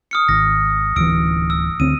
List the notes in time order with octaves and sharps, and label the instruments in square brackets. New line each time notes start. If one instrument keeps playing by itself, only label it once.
[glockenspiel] D#6 F6 C#7
[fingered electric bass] G#1 [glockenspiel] A#6
[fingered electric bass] D1 E3 [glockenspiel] E6 D7
[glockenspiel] E6
[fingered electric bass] D2 C4 [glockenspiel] D#7